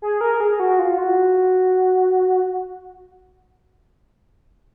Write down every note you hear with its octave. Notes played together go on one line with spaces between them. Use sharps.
G#4
A#4
G#4
F#4
F4
F#4